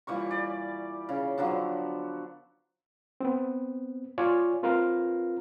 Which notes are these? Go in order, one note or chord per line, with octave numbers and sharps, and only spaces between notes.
A#2 E3 G3 C#6
D5
C#3
D3 F3 F#3 B3
B3 C4
F4 C#5 D5 G#5
C4 F4 A#4 B4 F5 A#5